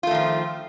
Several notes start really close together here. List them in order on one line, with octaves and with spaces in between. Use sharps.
F4 A3 D#3 F3